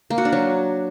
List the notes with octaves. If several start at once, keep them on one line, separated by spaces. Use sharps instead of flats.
A#3
F#4
D4
F#3